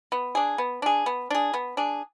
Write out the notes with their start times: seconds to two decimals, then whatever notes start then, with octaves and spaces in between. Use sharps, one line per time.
0.12 B3
0.35 D4 G#4
0.58 B3
0.82 D4 G#4
1.06 B3
1.30 D4 G#4
1.54 B3
1.77 D4 G#4